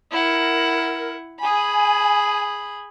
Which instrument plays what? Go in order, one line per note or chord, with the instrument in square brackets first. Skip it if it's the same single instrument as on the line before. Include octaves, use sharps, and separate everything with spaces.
[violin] E4 F#5 [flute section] A#4
[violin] G#4 B5 [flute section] G#5